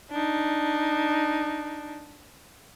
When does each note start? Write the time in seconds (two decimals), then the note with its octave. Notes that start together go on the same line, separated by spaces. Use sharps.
0.11 D4 D#4